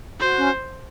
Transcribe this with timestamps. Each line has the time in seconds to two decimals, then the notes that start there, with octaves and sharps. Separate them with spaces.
0.20 F#4 C5
0.36 C#4